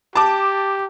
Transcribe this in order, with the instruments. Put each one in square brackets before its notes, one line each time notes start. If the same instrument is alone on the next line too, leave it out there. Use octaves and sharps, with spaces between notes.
[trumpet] G4 [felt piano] A5 D6